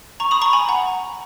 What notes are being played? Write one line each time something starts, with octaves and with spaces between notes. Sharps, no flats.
A#5 C#6
B5 D#6
A#5 C#6
G#5 B5
F#5 A#5